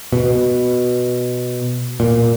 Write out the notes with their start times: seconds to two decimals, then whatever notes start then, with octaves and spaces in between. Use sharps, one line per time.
0.13 B2
2.00 A#2